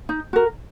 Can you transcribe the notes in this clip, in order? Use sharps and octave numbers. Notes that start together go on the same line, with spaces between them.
D#4
F#4 A#4